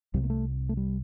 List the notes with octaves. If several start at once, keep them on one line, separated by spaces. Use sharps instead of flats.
C2 C3 G3
A#3
A3
A3
G3